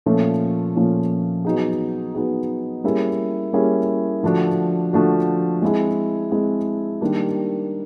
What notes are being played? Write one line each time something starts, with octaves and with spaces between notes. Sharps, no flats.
A#2 F3 A3 C#4 F4
A#2 F3 A3 C#4 F4
F#3 B3 D#4 G#4
F#3 B3 D#4 G#4
G3 A#3 C#4 E4 G#4
G3 A#3 C#4 E4 G#4
D3 F3 A3 D4 F#4
D3 F3 A3 D4 F#4
G#3 C4 E4 G#4
G#3 C4 E4 G#4
D#3 G3 A#3 D4 G4